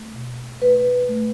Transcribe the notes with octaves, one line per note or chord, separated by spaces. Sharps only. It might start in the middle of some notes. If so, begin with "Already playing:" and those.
Already playing: A3
B2
A3 B4
A3